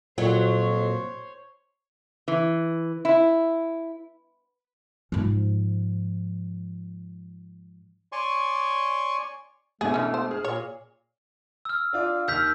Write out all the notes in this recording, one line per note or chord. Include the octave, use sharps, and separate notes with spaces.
F2 A#2 F#3 C5 C#5
E3
E4
G#2 F3
C#5 D5 G#5 C6 C#6
G#1 B2 A3 D4 G#4
E3 C#4
C5
G#4 F6
A#2 C#5
E6 F6
D4 F4 D5
D#2 E6 F6 G6 B6